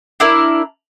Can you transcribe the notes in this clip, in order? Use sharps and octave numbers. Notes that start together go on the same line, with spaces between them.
D4 E4 A#4